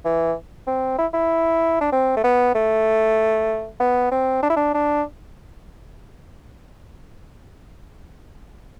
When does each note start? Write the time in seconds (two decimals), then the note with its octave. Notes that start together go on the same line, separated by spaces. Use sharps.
0.05 E3
0.67 C4
0.98 E4
1.13 E4
1.81 D4
1.92 C4
2.17 A3
2.24 B3
2.54 A3
3.80 B3
4.12 C4
4.43 D4
4.50 E4
4.56 D4
4.74 D4